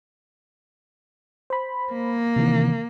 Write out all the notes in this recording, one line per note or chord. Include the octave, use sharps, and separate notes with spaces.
C5 B5
A#3
C3 D#3 E3